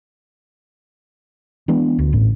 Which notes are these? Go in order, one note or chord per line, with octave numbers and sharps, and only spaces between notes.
E3 G#3 B3 D4
D2
A1 A2